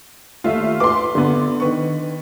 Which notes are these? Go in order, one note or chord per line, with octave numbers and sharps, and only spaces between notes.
D#2 A3 F4 E5
B4 C6 D6
D3 B3
D#3 B4 C#6